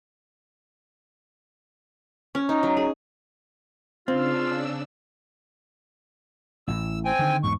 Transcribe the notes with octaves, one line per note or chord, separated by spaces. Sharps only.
C#4
D#4
F#3
G#4
C#3 C4 D4 F4 E6
A1 A2 E6
C4 G5 G#5
D3 D#3
E2 G#2 C#6